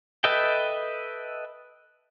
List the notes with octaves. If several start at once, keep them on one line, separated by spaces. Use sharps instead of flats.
A4 B4 D#5 E5 G5